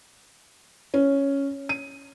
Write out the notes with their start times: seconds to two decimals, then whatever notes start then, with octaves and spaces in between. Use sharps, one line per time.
0.94 C#4
1.69 D#7